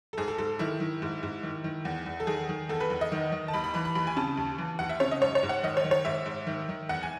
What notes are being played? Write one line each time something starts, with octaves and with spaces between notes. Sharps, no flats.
A4
G#2 G#4
A4
G#2 A4
D#3 E4
D#3
G#2
G#2
D#3
D#3
E2
E2
A4
D#3 G#4
D#3
E2 A4
B4
E2
D#5
D#3
D#3
A5
D#2 B5
B5
E3 B5
B5
D#2 B5
G#5
C#3 A5
D#2
E3
D#2 F#5
E5
C#3 C#5
D#5
G#2 C#5
C#5
G#2
F#5
D#3 D#5
C#5
D#3
C#5
G#2 E5
G#2
D#3
D#3
E2 F#5
G#5